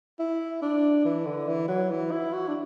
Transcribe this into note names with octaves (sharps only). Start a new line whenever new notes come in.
E4
D4
E3
D3
E3
F#3
E3
E4
F#4
D4